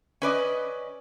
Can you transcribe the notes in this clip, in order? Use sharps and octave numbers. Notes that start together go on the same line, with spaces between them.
C#4 B4 D5 D#5